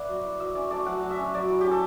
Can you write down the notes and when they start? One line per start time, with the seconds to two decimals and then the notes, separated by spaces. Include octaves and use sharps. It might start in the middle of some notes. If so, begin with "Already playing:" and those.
Already playing: B3 D5 E5 F#5
0.09 F#3
0.24 E4
0.40 F#3 E5
0.55 C#4 D5
0.71 A3 D5
0.86 F#3 F#5
1.03 F#3
1.11 E5
1.18 C#4
1.33 F#3 D5
1.50 E4
1.61 C#4 G4
1.71 A4